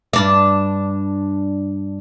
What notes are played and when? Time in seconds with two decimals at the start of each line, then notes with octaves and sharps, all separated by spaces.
0.13 G2 D4 D5